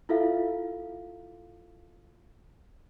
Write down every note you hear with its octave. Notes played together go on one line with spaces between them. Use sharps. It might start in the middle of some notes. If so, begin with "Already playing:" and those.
E4 F4 A4 E5 F5